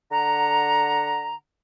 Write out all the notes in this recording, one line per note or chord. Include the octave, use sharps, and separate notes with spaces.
D3 F#5 A#5